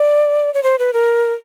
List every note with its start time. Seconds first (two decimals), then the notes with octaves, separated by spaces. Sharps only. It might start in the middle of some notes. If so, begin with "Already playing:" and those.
Already playing: D5
0.54 C#5
0.63 C5
0.79 B4
0.93 A#4